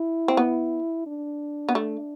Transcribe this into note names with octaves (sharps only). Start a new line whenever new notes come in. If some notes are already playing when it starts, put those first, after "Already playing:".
Already playing: E4
C4
B3
D4
B3
A3